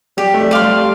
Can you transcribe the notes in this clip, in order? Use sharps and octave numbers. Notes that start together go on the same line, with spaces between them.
G3 G4
A3
G3
D5 F5 C6
G3